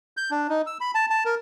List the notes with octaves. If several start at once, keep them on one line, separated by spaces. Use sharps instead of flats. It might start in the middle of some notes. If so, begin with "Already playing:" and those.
G6
D4
D#4
E6
B5
A5
A5
A#4